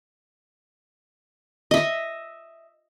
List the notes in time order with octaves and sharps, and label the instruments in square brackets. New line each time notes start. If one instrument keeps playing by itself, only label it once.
[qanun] D#5 E5